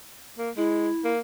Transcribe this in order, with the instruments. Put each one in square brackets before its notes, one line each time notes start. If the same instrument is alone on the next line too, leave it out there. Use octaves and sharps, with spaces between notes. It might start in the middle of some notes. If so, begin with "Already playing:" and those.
[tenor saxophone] A#3
[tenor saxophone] G#3 [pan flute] E4
[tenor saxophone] A#3